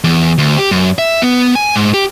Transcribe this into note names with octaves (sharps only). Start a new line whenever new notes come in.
E2
D2
G4
F#2
E5
B3
G#5
G#2
G4